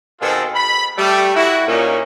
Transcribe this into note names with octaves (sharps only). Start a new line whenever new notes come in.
B2 D#3 C4 F4 G#4 A4
B5
G3 A3
E4 F#4
A#2 C#4 D#4